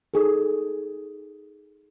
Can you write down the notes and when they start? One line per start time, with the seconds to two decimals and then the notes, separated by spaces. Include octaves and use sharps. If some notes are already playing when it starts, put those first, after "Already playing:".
0.14 D#4 G#4 A4